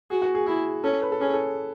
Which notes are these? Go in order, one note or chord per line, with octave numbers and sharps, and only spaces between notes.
F#4 G#4
F#4
G#4
E4 G#4
C#4 A4
B4
A4
C#4 G#4
A4